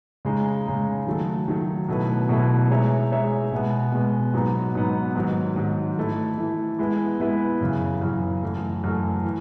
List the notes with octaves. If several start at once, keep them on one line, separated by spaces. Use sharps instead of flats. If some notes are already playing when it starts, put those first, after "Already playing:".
C#3 G#3 D#4
C#3 G#3 D#4
D#3 F#3 A3
D#3 F#3 A3
B2 F#3 A3 E4 B4
B2 F#3 A3 E4 B4
G#3 D#4 G#4 C#5 E5
G#3 D#4 G#4 C#5 E5
B2 G#3 B3
B2 G#3 B3
G#2 F#3 B3 D#4
G#2 F#3 B3 D#4
G#2 D#3 F#3
G#2 D#3 F#3
E3 A3 E4
E3 A3 E4
G#3 B3 E4 B4
G#3 B3 E4 B4
F#2 C#3 E3
F#2 C#3 E3
F#2 E3 A3
F#2 E3 A3
E3